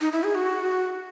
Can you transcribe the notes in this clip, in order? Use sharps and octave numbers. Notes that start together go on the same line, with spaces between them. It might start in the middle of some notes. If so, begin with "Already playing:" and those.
D#4
E4
G#4
F#4